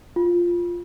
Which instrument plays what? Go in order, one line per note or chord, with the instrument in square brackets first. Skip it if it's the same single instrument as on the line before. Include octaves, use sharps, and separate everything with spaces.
[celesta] F4